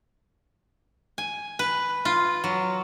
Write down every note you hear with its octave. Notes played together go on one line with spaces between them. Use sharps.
G#5
B4
F4
F#3